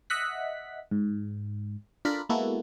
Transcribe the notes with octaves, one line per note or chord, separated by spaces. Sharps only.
D#5 E5 F#5 F#6 B6
G#2
D4 F4 A4 A#4 D5 B5
G#3 A#3 B3 E4 F#4 A4